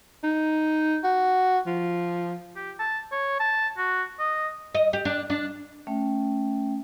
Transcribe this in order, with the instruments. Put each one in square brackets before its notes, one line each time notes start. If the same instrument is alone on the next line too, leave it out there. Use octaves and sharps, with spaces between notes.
[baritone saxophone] D#4
F#4
F3
[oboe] G4
A5
C#5
A5
F#4
D#5
[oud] D#5
G4
D4
D4
[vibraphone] A3 C#4 E5 G5 A5